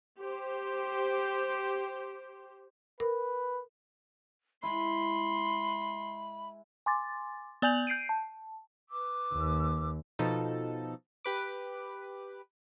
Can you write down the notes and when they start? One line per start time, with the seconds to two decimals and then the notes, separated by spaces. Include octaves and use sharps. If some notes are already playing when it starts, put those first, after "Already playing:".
0.20 G4 C5
3.00 A#4 B4
4.63 G#3 E4 B5 C6
6.86 G#5 C6 D6 A6
7.62 B3 D5 G#5 G6 F7 F#7
7.87 G6 C7 D7 D#7
8.09 A5
8.90 B4 D6 E6
9.33 D#2
10.19 B2 F3 D#4 A4
11.24 G4 B4 D6